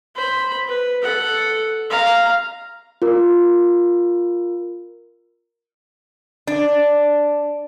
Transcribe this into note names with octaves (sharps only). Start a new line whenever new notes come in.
C5 B5
B4
A4 F#5
F5 A#5
F4 A#4
D4